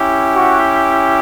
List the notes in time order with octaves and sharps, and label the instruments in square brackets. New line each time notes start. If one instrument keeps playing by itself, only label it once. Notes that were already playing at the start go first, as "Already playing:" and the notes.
Already playing: [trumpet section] C#4 E4 G4
F#4 F#5